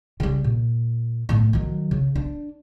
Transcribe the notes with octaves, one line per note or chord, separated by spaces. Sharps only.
C#3 G3
A#2
A2 A3
D#3 F#3
C#3
D4